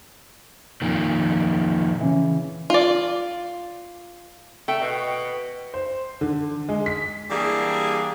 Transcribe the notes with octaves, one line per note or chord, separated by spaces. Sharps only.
F2 A#2 D#3
C#3 E3
F4 D5
A3 G5
B2
C5
D3
G#3
B6
E3 G3 A#3 D4 G4 G#4